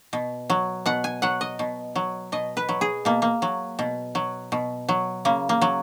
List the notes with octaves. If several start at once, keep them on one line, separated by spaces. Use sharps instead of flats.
B2
F#3
B2 F#5
G#5
F#3 F#5
D#5
B2
F#3
B2 D#5
B4
F#3
G#4
B2 A#3
A#3
F#3
B2
F#3
B2
F#3
C#3 A#3
A#3
F#3